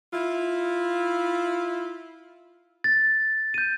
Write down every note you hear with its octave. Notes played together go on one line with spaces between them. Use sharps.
E4 F4
A6
G6 D#7